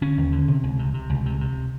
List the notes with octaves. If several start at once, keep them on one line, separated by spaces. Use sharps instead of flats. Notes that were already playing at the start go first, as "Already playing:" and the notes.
D3 C#4
D#2
D3
C3
C#2
C3
C3
C#2
C3
C3